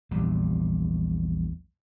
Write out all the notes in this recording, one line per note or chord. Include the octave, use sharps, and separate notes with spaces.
A#1 E2 A#2 G3